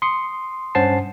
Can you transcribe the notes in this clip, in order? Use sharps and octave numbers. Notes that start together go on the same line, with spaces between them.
C6 D#6 C#7
G2 C#4 C5 F#5 A5 C7